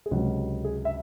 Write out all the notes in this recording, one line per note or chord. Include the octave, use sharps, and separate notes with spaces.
G#4
C#2 C3 F#3 F#4
G#4
E5